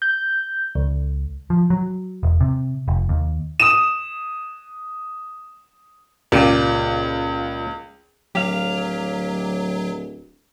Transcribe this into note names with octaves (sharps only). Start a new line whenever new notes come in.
G6
C#2
F3
F#3
E1
C3
F1
D#2
D#6 E7
C#2 A#2 G4
D1 F#3 G4 F5